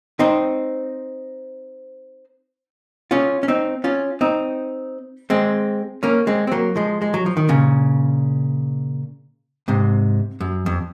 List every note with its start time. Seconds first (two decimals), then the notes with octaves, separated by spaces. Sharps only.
0.19 C4 D#4
3.11 C#4 F4
3.43 C#4
3.48 C4 D#4
3.84 C#4 F4
4.21 C4 D#4
5.30 G#3 C4
6.03 A#3 C#4
6.27 G#3 C4
6.47 C4
6.52 F#3 A#3
6.76 F3 G#3
7.02 G#3
7.14 F#3
7.26 F3
7.37 D#3
7.49 A#2 C#3
9.68 G#2 C3
10.41 F#2
10.66 F2